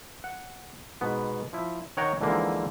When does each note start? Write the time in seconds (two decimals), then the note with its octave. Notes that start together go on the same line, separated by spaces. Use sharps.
0.24 F#5
1.01 G#2 B2 B3
1.53 F3 E4
1.97 D#3 C#5 F#5 G5 A#5
2.21 G#2 D3 E3 F3 A#3